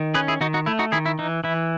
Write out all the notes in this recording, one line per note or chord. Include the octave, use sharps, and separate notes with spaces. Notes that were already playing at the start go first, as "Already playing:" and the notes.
Already playing: D#3
C#4 G#4 B4
E4 G#4
D#3 D#4 F#4
D#4 F#4
A3 E4
D#4 F#4
D#3 E4 G#4
E4
E3 D#4
E3 E4